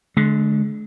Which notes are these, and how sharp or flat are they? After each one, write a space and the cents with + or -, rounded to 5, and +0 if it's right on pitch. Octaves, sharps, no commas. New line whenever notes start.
D3 +0 G#3 +40